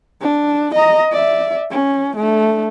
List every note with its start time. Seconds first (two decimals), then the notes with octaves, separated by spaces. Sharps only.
0.21 D4
0.74 D#5 A#5
1.12 D5 E5
1.71 C#4
2.16 A3 D4